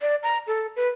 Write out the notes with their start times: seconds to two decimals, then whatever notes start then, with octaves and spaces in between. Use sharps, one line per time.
0.02 D5
0.23 A#5
0.47 A4
0.76 B4